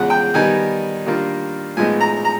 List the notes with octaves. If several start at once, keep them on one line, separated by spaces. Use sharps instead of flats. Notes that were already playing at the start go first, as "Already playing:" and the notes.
Already playing: E2 C#3 F3 G#3 F#5
G5
D#3 G3 B3 D#4 G#5
D#3 G3 A#3 D4 F4
A2 F3 G#3 B3 D#4 G#5
A#5
A#5